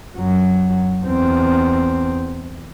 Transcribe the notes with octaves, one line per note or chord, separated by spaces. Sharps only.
F#2 F#3
E2 C4